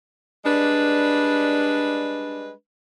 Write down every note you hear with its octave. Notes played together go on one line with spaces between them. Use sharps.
G3 G#3 D4 B4